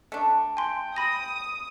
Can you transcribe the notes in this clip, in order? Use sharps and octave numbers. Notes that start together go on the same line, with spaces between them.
A3 D4
G5 G#5 C6
B5 D#6 A#6